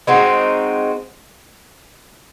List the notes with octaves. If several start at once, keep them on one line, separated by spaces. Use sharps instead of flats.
G#3 C4 D#4 F#4